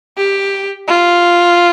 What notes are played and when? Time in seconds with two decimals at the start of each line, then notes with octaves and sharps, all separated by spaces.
0.18 G4
0.88 F4